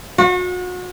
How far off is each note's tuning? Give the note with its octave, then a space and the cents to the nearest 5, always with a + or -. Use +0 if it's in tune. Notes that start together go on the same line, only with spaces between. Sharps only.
F#4 -35